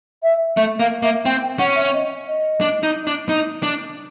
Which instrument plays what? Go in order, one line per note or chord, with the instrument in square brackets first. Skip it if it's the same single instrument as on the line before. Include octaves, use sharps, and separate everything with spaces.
[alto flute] E5
[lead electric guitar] A3 [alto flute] E5
[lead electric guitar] A#3 [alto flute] F5
[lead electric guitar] A#3 [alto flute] E5
[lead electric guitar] C4 [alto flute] G5
[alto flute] G5
[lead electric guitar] C#4 [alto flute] F#5
[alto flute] E5
D#5
D#5
[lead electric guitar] D4
D#4
D4
D#4
D4